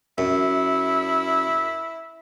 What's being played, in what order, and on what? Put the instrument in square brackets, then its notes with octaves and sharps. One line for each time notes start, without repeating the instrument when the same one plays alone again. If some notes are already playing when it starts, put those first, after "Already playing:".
[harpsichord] F#2 [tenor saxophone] E4